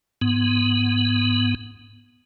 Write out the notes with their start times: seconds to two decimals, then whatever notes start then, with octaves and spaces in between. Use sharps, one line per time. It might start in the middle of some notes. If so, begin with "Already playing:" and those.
0.21 G#2 B3